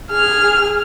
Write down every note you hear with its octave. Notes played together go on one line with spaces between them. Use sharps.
G#4 F6